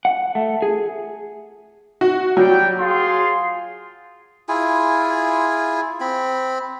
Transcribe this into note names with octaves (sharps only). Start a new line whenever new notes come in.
F#5
A3
G#4
F#4
F#3 G3 G5
F4 G#4 C6
E4 F4 G#4 G#5
C4 B5